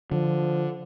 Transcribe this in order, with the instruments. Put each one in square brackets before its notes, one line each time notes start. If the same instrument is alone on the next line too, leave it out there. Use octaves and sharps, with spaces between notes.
[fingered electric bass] D3 [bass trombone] F3